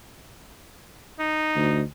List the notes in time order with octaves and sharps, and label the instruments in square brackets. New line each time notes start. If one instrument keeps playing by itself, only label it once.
[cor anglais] D#4
[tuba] D2